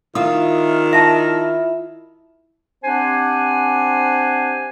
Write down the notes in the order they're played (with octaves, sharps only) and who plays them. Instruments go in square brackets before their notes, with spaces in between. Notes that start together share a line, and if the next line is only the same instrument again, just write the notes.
[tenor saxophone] D#3 [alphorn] E4 [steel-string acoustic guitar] F4 [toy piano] D#6
[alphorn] E4 [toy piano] E5 A5
[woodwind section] C4 D4 G4 C5 F#5 G#5